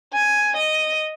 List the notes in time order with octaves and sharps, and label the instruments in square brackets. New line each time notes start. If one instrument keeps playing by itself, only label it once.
[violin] G#5
D#5